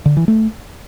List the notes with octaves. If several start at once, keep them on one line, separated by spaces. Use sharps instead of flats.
D3
E3
A3